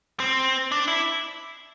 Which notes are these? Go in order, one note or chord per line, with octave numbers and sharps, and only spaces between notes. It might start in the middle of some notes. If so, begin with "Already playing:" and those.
C4
D4
E4